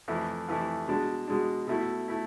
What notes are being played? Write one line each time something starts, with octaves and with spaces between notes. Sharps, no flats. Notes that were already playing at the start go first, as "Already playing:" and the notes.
F2 E3 A3 E4
F2 E3 A3 E4
B2 G#3 D4
B2 G#3 D4
B2 A3 E4
A3 E4